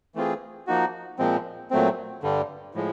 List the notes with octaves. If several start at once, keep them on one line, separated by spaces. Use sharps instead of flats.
E3 A3 C4 F4 G#4
F3 A#3 D#4 F#4
A#2 F3 G#3 C4
A#2 F#3 A3 C4
G2 D3 G3
A2 F3 G#3